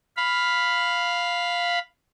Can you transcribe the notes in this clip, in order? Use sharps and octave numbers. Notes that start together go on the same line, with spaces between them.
F5 B5